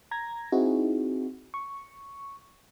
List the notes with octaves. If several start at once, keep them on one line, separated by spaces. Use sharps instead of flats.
A#5 G#6 A#6
C4 D#4 E4 F#4 G#4
C#6